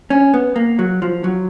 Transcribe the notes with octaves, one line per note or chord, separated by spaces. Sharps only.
C#4
B3
A#3
F#3
F3
F#3